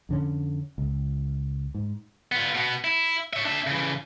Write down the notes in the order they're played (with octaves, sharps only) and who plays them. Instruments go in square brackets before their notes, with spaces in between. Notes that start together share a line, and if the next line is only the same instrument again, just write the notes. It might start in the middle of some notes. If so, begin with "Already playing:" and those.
[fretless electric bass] F2 D3 C#4
C#2
G#2
[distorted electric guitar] B3 F4
B2 B3
E4
C#5 E5
D4 E5
C#3 E3